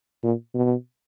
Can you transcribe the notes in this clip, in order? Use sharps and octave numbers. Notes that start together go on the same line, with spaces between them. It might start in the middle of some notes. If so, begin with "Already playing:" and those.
A#2
B2